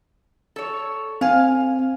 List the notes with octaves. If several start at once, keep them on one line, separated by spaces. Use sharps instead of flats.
A4 C#5
C4 F5 G#5